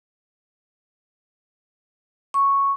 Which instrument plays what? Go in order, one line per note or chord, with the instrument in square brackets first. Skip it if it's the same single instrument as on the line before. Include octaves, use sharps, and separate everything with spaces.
[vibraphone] C#6